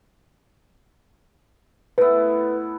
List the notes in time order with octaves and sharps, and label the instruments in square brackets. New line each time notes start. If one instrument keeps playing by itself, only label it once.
[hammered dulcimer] A2 B3 [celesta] B4